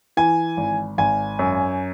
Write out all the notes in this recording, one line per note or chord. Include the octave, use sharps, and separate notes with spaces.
E3 G#5
G#1
G#1 G#5
F#2